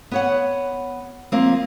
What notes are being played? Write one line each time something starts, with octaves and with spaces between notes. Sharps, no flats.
B3 C#5 F#5
F3 A#3 C4